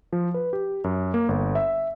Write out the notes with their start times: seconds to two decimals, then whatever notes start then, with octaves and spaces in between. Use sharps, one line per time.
0.13 F3
0.34 B4
0.53 G4
0.84 F#2
1.14 A#3
1.29 G1
1.55 E5